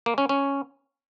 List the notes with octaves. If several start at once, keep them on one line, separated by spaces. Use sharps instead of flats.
A#3
C#4
C#4